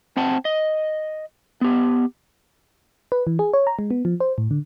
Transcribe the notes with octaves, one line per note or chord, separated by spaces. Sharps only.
C4 C5 F#5 A5
D#5
B3 G4
B4
E3
G#4
C#5
A#5
G#3
B3
F3
C5
A2
D3